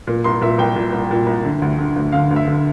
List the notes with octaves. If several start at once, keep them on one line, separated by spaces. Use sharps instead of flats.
A#2
C2 C6
A#2 E5
C2 G5
A#2
C2
A#2
C2
D3
D2
D3
D2
D3 F5
D2
E5
D3